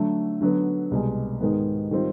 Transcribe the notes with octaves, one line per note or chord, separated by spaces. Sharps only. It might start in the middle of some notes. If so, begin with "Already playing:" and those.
Already playing: D3 F#3 A3
D3 F#3 B3
C2 B2 G#3
G#2 D#3 G#3 B3
D#3 G3 C4 F4